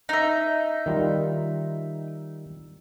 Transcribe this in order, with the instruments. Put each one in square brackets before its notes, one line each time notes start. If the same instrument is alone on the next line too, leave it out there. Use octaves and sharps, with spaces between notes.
[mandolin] D#4 E5
[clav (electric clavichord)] D#3 G3 F4